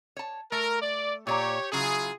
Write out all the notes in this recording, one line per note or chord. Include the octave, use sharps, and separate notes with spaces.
C#5 A5
A3 A#4
D5
A#2 G4 C#5 D5 A#5
C#3 F#3 E4 F4 G#4